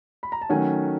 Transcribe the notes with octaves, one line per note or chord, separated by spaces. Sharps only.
B5
A#5
A5
D#3 F#3 A3 C#4 F#5 G#5